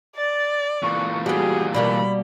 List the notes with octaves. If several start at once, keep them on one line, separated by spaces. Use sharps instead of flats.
D5 A6
A#2 E3 C#6
G3 B3 F#4 G#4
B2 G3 A#3 D5 B5